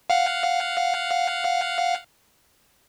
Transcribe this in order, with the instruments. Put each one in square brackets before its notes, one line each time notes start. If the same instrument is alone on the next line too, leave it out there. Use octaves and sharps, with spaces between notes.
[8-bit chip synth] F5 F#5